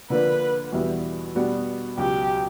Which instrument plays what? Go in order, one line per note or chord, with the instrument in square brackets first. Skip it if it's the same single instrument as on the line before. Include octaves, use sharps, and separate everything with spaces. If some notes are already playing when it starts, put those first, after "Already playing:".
[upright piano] D3 F3 A#3 D4 [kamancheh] B4
[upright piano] E2 B2 G3 B3 E4
B2 G3 B3 D4 F#4
[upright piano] C#2 B2 F#3 [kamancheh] G4